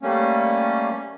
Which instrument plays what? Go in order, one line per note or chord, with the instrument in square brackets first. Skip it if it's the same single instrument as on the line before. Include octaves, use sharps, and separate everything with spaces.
[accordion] G3 A3 A#3 C#4